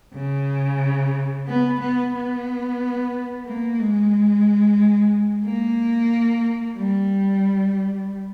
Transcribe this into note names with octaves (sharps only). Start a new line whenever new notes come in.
C#3
B3
B3
B3
A#3
G#3
A#3
G3